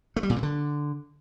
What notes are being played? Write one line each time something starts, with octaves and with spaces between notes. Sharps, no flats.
A3
G3
A#2
C3
D3